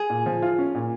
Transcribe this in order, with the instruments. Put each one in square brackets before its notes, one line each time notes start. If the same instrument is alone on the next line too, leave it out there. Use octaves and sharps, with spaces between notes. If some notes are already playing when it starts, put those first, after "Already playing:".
Already playing: [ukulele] G#4
[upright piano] A#2
F3
F4
C#4
A#2